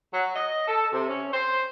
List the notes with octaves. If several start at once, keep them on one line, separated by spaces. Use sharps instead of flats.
F#3
D#5
A4
C3
C#4
C5